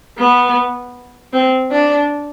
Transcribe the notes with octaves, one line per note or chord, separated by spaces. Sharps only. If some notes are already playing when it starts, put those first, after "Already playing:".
B3
C4
D4